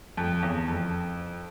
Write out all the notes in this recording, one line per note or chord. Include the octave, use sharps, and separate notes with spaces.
F2
E2
F2